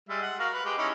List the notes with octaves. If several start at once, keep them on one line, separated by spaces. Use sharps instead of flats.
G3 G#3 E5
F#5
F#4 A#4 F5
B4
G#3 G4
C#4 D#4 E4